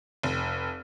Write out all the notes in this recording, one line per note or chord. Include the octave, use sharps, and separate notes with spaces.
F1